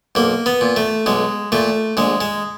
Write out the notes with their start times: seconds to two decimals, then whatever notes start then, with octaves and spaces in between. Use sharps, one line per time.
0.15 B1 A#3
0.46 B3
0.61 A#2
0.76 A3
1.06 B1 G#3
1.52 A#2 A3
1.97 A#1 G#3
2.21 G#3